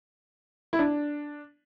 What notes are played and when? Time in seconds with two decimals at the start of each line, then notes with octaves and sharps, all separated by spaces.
0.73 E4
0.79 D4